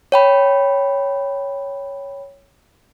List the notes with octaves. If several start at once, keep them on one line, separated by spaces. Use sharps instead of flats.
C#5 G5 B5